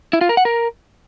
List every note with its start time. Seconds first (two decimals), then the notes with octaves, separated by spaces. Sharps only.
0.13 E4
0.21 F4
0.29 A#4
0.37 F#5
0.45 A#4